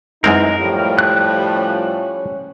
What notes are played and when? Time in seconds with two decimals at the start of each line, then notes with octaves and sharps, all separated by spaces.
0.24 F#2 E3 G#3 C4 D#4 A#4
0.60 A2 F3 G3 G4
0.99 F#6
1.57 C#4